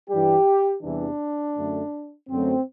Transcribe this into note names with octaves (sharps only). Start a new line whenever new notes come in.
G2 E3 G3 G4
E2 C3 E3 G3 D4
F#2 D3 A3
F#2 D3 F#3 A3 C4